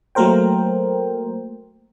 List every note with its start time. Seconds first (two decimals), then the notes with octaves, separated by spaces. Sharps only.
0.15 F#3 A3 A#3 A#4 C5 G5